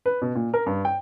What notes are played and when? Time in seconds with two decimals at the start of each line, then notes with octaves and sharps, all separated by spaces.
0.06 B4
0.22 B2
0.35 A#2
0.54 A#4
0.66 G2
0.85 G5